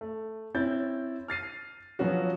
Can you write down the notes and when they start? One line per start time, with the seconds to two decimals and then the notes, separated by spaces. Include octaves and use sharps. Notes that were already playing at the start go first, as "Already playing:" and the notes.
0.01 A3
0.55 C4 C#4 E4 G6 A6
1.28 F6 A6 C7 D#7
1.99 F3 F#3 B3 C#4 F#4